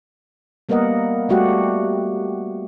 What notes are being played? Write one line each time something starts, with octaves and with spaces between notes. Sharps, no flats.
G3 A#3 B3 A#4 D#5 F#5
G3 A3 F#4 G4 F#5